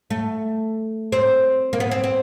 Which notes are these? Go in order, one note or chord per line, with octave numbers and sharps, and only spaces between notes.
A3
C4
A#3
B3
C4
C4